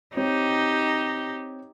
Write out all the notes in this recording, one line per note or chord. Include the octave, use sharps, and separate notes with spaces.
C4 D#4 G4 C#5